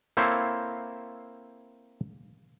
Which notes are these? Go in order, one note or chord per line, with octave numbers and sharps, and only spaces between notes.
A#3 C4 E4 A4 C5 C#5